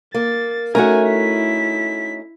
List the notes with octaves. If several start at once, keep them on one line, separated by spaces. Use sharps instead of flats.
A#3 A6
A3 C#4 D#4 F#4 A#4 G#5
E4 B6